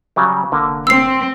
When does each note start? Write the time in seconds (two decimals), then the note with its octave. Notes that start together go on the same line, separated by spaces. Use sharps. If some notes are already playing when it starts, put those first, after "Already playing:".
0.16 C#3 F#3 G3
0.52 F1 D3 A#3
0.87 C4 E6 C7